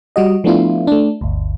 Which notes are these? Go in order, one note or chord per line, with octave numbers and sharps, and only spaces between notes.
G3 F#4 D#5
F3 A3 B3 D4 E4 F4
A3 D4
G1 D2